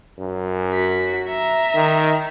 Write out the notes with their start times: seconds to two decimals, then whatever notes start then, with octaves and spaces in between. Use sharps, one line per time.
0.19 F#2
0.72 F#4 B6
1.29 E5 A#5
1.75 D#3